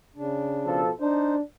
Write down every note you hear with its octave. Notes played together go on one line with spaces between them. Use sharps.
C#3 D4
B2 F3 A4
D4 D#4 C5